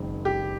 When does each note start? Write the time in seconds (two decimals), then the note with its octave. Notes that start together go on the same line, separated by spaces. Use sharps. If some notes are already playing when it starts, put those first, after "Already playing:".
Already playing: F#1 F#2 D#3 G#3 C4
0.25 G4